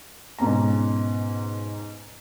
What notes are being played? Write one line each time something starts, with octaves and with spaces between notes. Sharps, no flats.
G#2 B2 C#4 A#5